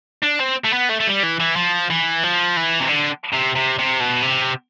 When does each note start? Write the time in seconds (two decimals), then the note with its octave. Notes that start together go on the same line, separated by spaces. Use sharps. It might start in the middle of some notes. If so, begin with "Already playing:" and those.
0.24 D4
0.40 C4
0.65 A3
0.73 B3
0.90 A3
1.00 A3
1.07 G3
1.23 E3
1.40 E3
1.56 F3
1.90 E3
2.23 F3
2.57 E3
2.80 C3
2.89 D3
3.34 C3
3.56 C3
3.79 C3
4.00 B2
4.22 C3